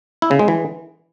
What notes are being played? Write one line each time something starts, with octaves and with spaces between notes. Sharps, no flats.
E4
C#3
G#3
E3